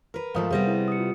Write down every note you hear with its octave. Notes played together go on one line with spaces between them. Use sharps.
A#4 B4
G#2 F3 A3 A#4 F5 D#6
C3 G3 B3 G#4 C5 A#6
E4
D#6 C#7
F4